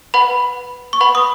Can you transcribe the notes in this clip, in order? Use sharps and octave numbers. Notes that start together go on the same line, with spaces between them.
B4 F#5 B5
C#6
B4 F#5 B5
D#6